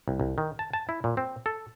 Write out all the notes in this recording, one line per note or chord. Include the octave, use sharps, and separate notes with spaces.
C2
C2
D#3
A5
A5
E4
A#2
C4
A4